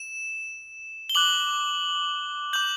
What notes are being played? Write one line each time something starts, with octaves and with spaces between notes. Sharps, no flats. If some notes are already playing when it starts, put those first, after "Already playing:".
Already playing: E7
G7
D6 F#6 F#7
D6 G6 F#7